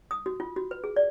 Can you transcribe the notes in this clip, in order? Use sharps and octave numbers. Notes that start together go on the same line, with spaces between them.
D#6
F#4
F4
F#4
B4
G#4
D5